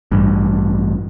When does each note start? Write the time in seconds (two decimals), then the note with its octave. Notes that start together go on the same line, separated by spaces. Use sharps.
0.12 A1 G2